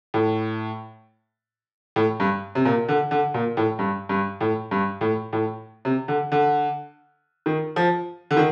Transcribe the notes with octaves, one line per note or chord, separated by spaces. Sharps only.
A2
A2
G2
C3
A#2
D3
D3
A#2
A2
G2
G2
A2
G2
A2
A2
C3
D3
D3
D#3
F3
D3
D#3